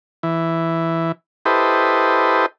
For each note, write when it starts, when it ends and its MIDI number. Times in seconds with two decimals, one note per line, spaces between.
0.23 1.12 52
1.45 2.46 64
1.45 2.46 67
1.45 2.46 69
1.45 2.46 71
1.45 2.46 72
1.45 2.46 75